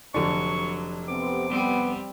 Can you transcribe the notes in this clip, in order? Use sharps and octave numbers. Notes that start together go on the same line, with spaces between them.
F1 D3 F#3 D4 C#6
C3 B3 C4 D6
G3 B3 C4